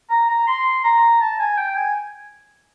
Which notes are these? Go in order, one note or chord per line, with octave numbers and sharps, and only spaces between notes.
A#5
A#5
C6
A#5
A5
G#5
G5
G#5